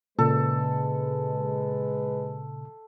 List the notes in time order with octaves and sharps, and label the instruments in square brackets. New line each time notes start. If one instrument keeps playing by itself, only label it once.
[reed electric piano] A#2 C#3 [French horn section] G#3 B4 [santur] A4